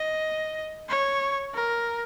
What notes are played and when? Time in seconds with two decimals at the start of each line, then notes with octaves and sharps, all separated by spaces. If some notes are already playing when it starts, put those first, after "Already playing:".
Already playing: D#5
0.89 C#5
1.54 A#4